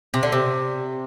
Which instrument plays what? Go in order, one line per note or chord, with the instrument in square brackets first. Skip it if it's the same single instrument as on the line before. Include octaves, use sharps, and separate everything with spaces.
[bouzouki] C3
D3
C3